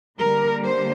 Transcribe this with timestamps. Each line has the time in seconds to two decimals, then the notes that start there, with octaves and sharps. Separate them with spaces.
0.18 D3 G3 A#3 A#4
0.62 C5